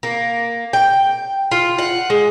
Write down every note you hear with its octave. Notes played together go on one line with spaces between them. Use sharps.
A#3
G5
F4
F#5
G#3